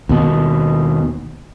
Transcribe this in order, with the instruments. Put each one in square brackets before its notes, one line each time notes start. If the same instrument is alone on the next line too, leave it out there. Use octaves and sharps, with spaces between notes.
[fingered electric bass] D#2 B2